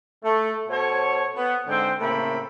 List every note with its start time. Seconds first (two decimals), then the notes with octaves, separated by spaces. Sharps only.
0.24 A3
0.69 B2 A4 C5 C#5
1.35 B3
1.67 G#2 D3 G#3 C4 C5 G5
2.00 A2 C#3 A#3 C4 E5 B5